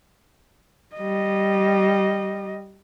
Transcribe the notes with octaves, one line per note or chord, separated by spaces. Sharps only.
G3 D#5